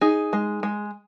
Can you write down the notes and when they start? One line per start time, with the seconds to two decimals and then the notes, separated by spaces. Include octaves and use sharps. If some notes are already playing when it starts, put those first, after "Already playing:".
0.01 D#4 G#4
0.33 G#3
0.63 G#3